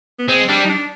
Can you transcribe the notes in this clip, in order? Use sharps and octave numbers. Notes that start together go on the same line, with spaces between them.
B3
G#3 C4
G3 D4
D#4
D4